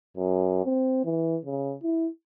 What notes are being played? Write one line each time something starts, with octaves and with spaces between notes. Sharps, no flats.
F#2
C4
E3
C#3
E4